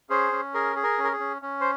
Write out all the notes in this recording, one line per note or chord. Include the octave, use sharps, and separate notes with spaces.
C#4 G#4 C5
C#4
G#4 A#4
G#4
A#4
C#4
A#4
G#4
C#4
C#4
C5